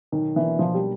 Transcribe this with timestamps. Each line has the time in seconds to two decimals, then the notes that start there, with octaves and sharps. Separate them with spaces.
0.12 B1 D#3
0.35 B2 E3 F#3 A#3 D4
0.59 B1 F3
0.74 G3